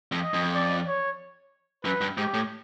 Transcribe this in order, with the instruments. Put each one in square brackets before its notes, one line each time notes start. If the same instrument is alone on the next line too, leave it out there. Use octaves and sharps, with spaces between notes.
[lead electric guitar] F2
[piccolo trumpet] D#5
[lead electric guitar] F2
[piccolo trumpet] D5
C#5
[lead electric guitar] F#2 [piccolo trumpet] B4
[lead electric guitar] G2
[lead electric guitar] G#2 [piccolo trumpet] G4
[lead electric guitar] A2